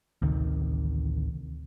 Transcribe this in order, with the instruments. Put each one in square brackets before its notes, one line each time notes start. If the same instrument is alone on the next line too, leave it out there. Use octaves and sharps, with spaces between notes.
[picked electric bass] A1 D2 C3 D#3